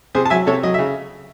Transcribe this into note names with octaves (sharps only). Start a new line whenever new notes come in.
C3 G#4 C5
A5
F#3 E5 G#5
C3 A4 C#5
F#3 D#5
C#3 E5